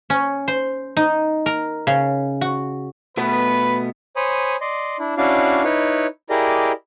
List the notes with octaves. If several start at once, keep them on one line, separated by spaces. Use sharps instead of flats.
C#4
C5
D#4
A#4
C#3
F#4
B2 A3 B3 B4
C5 C#5 G#5 B5 D#6
D5 D#5 C6
D4 E4
C#4 D4 E4 F#4 D5 F5
D#4 E4 B4 C#5
E4 G4 G#4 A#4 D5 D#5